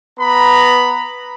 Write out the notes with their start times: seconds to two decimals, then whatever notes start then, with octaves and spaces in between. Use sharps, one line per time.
0.19 B3 B4 A#5 B5